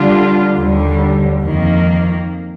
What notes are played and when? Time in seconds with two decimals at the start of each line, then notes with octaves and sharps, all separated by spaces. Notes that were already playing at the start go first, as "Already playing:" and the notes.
Already playing: D3 G3 D4 F4
0.56 D#2 D3 G3
1.42 F2 D#3 A#3